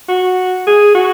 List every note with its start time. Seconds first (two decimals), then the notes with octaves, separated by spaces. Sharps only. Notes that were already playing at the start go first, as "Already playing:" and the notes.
0.09 F#4
0.67 G#4
0.95 F#4